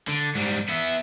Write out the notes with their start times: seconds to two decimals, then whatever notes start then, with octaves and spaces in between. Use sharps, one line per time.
0.08 D3
0.35 G#2 G3
0.68 B3 E5